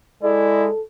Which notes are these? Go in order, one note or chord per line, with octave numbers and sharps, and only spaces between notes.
G#3 E4 A4 D5